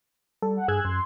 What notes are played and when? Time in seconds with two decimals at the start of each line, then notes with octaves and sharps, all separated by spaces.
0.42 G3 A4
0.56 F#5
0.68 G2 G#4 E6 F#6 G#6
0.85 F#2 C6